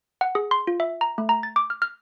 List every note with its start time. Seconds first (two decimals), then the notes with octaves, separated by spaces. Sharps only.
0.21 F#5
0.35 G#4
0.51 C6
0.67 F4
0.80 E5
1.01 A#5
1.18 A3
1.29 A#5
1.43 A6
1.56 D6
1.70 F6
1.82 F6